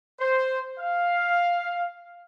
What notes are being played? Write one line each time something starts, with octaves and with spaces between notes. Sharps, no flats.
C5
F5